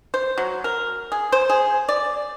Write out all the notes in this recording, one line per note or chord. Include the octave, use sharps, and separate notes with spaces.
C5
F#3
A#4
G#4
C5
G#4
D5